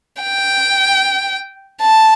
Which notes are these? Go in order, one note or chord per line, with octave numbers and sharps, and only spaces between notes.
G5
A5